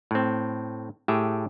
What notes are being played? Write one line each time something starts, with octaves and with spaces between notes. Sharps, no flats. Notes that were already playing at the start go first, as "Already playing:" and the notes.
A2 C4
A2 G4 G#4 E5